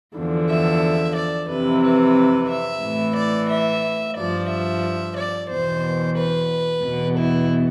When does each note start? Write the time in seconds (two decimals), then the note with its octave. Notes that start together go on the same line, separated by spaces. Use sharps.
0.16 E2 D3 F3
0.50 E5
1.16 D5
1.50 F2 C3 E3 B4
1.84 B4
2.50 E5
2.83 A2 E3
3.17 D5
3.51 E5
4.17 G2 F3 D5
4.51 E5
5.17 D5
5.50 E2 B2 C5
6.18 B4
6.84 E2 B2
7.18 E4